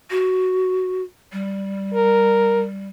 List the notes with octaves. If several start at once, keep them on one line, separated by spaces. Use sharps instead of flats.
F#4
G3
A#4